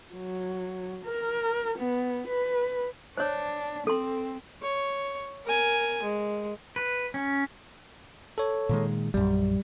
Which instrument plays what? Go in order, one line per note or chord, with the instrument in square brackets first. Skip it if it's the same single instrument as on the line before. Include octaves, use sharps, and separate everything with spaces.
[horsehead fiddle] F#3
A#4
B3
B4
[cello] D4 [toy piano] C5 C#5
[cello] C4 [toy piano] A4 C6
[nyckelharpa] C#5
A#4 G#5
G#3
[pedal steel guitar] B4
C#4
[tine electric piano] A4 C#5
[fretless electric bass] A#2 D#3 G#3
[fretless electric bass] A#1 F#2 [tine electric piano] G3